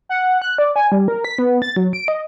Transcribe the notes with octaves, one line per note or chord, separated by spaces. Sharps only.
F#5
F#6
D5
G#5
G3
A#4
B6
B3
A6
F#3
D7
D#5